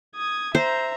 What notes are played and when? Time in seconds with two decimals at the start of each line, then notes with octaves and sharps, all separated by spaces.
0.16 D#6 G#6
0.55 C5 E5 A#5